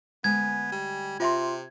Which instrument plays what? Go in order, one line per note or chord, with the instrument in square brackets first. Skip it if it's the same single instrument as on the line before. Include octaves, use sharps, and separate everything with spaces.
[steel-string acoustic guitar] D2 G#3 G#5 [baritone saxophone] B3 [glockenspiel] G#6
[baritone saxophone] G3
[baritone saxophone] C3 [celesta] F4 E5 C6